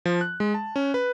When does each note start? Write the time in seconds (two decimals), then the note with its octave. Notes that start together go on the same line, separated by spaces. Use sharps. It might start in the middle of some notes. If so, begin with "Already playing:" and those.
0.05 F3
0.21 F#6
0.40 G#3
0.54 A5
0.76 C#4
0.94 B4